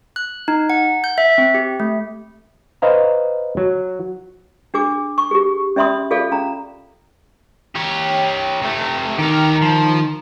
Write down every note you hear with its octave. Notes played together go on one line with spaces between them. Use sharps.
F#6
D#4
F#5
G6
E5
C4
G4
A3
B4 C5 D#5 F5 A#5
F#3
D4 G#4 D6
C#6
G4 G#4
C#4 D5 E5 B5 C6 D#6
F4 G#4 A4 D5 F5
C#4 A#5
G4 C#5
C3 A3
D#3 G4 A#4
F3